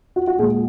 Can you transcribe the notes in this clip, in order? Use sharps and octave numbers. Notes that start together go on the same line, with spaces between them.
F#4
F#4
A#2 G#3 G#4